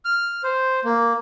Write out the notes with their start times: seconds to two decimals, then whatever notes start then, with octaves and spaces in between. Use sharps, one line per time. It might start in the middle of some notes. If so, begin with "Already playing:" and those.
0.05 F6
0.44 C5
0.85 A#3